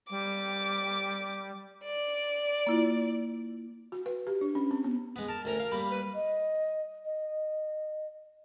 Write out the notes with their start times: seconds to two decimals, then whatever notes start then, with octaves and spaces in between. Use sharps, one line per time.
0.10 G3 D6
1.84 D5
2.67 A#3 E4 F4
3.92 F#4
4.06 B4
4.27 G4
4.41 D4
4.55 C#4
4.71 C4
4.84 B3
5.16 G#3 B3
5.28 A#4 A5
5.45 D2 C#4 A#4 A#5
5.60 F5
5.72 G3 A#3 B5
5.91 B4
6.14 D#5
7.05 D#5